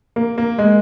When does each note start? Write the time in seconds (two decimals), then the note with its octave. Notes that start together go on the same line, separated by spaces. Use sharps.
0.16 A#3
0.38 A#3
0.58 G#3